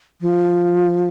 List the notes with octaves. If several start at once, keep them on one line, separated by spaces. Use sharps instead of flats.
F3